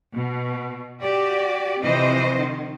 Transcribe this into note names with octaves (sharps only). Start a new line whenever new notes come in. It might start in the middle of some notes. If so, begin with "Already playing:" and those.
B2
F#4 G4 D5
C3 E3 F3 C4 C5 D#5
D#3